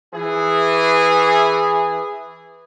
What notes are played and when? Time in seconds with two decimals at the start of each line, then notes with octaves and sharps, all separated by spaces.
0.14 E3 G#4